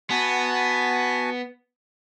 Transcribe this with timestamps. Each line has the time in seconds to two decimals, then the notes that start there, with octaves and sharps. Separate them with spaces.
0.10 B3 F#4 G#5 A5